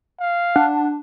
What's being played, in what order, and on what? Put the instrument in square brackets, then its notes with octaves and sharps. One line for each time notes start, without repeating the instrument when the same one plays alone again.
[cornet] F5
[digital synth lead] D4 [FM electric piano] F#5